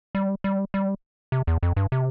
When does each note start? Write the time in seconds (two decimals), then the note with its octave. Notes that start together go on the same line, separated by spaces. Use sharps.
0.15 G3
0.44 G3
0.74 G3
1.32 C3
1.47 E2
1.63 F2
1.76 G2
1.92 C3